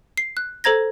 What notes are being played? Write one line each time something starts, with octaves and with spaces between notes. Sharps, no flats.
C7
F#6
A4 C5 A#5 G#6 A#6